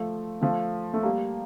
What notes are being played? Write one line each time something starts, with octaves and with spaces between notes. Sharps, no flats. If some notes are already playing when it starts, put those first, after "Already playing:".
Already playing: F3 A3
F3 A3
A3
G3 A#3